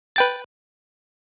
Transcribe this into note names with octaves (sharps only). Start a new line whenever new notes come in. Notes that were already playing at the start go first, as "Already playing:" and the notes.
B4 G5 A6